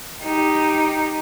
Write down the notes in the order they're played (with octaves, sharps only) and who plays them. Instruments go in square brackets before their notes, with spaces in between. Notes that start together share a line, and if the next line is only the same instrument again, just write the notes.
[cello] D#4 G4